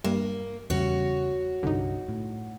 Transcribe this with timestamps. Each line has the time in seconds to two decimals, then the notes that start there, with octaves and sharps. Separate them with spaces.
0.04 G2 A#3
0.70 E2 C#3 G3 F#4 C#5
1.63 C2 G2 D3 D#4
2.08 A2